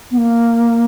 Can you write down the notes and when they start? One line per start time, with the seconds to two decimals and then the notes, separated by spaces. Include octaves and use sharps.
0.11 B3
0.18 A#3